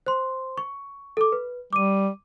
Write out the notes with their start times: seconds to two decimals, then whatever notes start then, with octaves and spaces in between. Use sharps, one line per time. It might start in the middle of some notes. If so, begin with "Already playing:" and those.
0.06 C5 C6
0.58 C#6
1.17 A4 D6
1.32 B4
1.73 G3 D6 D#7